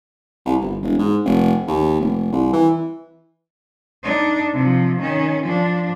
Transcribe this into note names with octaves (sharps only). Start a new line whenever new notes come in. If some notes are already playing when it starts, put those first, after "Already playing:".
C2
G1
E1
G#2
F1
D#2
F1
C2
E3
D4 D#4
C3 F3
D#3 C#4
F3 D4